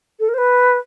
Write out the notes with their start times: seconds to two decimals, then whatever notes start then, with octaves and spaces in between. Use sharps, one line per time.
0.20 A4
0.28 A#4
0.34 C5
0.38 B4